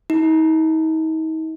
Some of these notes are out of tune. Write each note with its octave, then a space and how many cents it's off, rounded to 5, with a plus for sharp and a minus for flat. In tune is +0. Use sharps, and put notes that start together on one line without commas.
D#4 +40